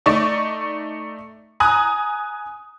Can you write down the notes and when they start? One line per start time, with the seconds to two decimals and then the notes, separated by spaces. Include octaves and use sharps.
0.06 A3 D#4 D5 C#6
1.60 G#5 A#5 D#6 F#6